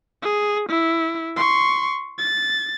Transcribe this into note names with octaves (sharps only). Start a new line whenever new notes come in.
G#4
E4
C6 C#6
A6